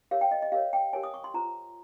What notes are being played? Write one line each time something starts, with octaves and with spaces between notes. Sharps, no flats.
G4 A#4 C#5 F5
G5
D#5
D#5
G4 A#4 C#5 F5
G5
G4 A#4 C#5 G#5
D#6
C#6
C6
F4 C5 A#5